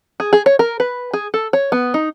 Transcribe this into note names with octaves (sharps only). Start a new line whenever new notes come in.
G#4
G#4
C#5
A#4
B4
G#4
A4
C#5
B3
D#4